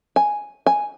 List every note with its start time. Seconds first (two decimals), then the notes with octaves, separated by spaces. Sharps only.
0.16 G#5
0.66 G#5